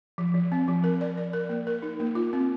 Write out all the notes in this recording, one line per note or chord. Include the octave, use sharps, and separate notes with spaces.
F3
F3
C4
F3
A#4
D5
D5
A#4
A#3
A#4
D#4
A#3
F4
C4